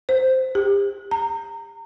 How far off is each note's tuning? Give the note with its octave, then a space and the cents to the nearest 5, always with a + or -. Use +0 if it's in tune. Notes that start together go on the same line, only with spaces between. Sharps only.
C5 -5
G4 +35
A#5 -30